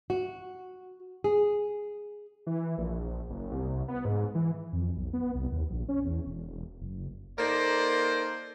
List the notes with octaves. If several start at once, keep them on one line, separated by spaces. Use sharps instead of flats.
F#4
G#4
E3
A#1
F#1
C2
B3
G#2
E3
F2
B1
B3
C2
D#2
A#1
C#4
E2
E1
F#1
A#3 D#4 A4 A#4 C5 D5